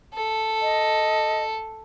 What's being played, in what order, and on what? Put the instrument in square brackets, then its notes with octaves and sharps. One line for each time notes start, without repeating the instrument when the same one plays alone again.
[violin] A4
[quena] D#5